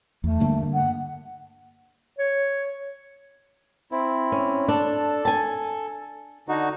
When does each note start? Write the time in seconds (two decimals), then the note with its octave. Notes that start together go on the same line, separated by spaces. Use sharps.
0.24 E2 A3
0.40 G2 D3 A#3
0.74 F#5
2.19 C#5
3.92 C4 E4
4.32 C#4
4.68 D4 A4
5.25 G#5 A5
6.48 D3 D#4 F#4